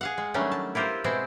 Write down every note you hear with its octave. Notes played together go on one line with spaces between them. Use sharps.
G#4 F5 F#5
G#3
D#3 F#3 G3 A3 C#4 D4
A5
E4 F4 G4 A#4 C5
B2 G#3 C4 E4 C5